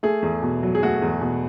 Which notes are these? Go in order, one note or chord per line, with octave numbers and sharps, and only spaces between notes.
A3 G#4
E2
B2
F#3
G#4
A3 F#4
E2
B2